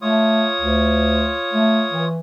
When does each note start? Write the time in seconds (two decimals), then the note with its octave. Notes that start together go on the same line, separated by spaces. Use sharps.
0.02 A3 F4 C#5 D#6
0.60 D2
1.53 A3
1.93 E3